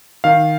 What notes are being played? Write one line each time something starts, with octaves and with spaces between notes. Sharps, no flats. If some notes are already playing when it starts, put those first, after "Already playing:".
D#3 F5